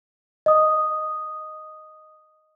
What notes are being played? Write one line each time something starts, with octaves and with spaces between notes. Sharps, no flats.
D#5 D#6